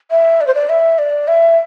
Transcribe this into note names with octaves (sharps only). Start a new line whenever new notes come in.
E5
D5
C5
D5
E5
D5
E5